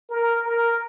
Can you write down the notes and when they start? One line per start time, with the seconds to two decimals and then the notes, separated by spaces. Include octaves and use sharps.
0.10 A#4
0.45 A#4